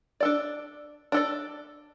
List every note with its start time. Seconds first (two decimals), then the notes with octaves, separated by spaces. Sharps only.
0.20 D4 A4 D5
1.12 D4 A4 D5